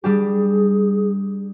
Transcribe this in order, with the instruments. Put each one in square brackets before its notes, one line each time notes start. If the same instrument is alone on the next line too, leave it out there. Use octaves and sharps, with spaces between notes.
[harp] G3 D4 G4 [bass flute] G#4